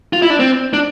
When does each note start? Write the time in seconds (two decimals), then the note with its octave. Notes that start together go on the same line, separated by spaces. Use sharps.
0.13 F4
0.22 E4
0.30 D4
0.40 C4
0.73 D4